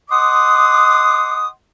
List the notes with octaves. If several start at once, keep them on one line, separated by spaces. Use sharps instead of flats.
D#5 F#5 C6 D6 D#6